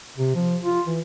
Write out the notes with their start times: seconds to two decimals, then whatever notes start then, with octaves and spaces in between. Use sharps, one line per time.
0.17 C3
0.35 F3
0.64 F4
0.87 E3